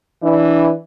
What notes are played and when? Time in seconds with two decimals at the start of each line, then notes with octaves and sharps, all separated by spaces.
0.22 E3 D4